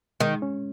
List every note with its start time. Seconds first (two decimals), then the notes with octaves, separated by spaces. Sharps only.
0.20 D#3 G#3
0.42 C#4